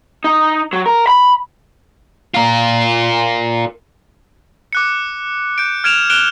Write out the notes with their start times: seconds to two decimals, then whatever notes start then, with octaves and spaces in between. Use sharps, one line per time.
0.24 D#4
0.73 F#3
0.86 A#4
1.07 B5
2.34 F4 A#4
4.73 D6 F#6 C#7
5.58 G6 D7
5.84 F6 G#6 D7 E7 F7
6.10 F6 F#6 D7 E7 F7 G7